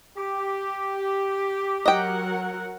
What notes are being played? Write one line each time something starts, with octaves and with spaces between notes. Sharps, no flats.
G4
F#3 A#4 D#5 F#5 G5